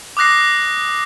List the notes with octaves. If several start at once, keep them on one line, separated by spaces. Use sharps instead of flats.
D6 D#6 F#6 A#6 C7